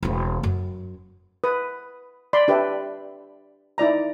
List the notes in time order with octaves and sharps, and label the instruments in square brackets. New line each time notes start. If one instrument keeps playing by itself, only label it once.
[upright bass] E1 C4
F#2
[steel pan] B4 D#6
D5 B5 C6
D4 G4 B4 C#5 E5
D#4 E4 D5 A#5